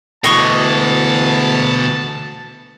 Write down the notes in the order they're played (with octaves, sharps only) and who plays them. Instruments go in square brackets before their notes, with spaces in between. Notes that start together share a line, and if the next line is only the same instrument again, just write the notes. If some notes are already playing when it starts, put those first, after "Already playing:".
[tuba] D2 [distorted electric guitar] B2 E3 [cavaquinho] D#5 C#6 D6 [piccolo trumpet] A5